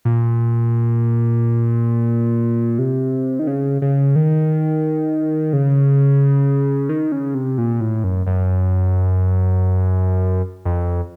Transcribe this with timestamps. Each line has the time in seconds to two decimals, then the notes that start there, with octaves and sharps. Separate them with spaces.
0.05 A#2
2.79 C3
3.39 D#3
3.47 C#3
3.82 C#3
4.16 D#3
5.53 C#3
6.89 D#3
7.12 C#3
7.35 C3
7.58 A#2
7.81 A2
8.04 F#2
8.27 F#2
10.65 F2